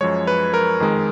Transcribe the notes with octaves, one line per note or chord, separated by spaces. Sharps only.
F#2 F3 G#3 C#5
B4
A#4
F2 D#3 G#3